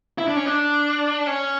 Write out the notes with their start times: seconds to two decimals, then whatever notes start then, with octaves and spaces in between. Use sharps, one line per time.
0.18 E4
0.28 D4
0.37 C#4
0.46 D4
1.27 C#4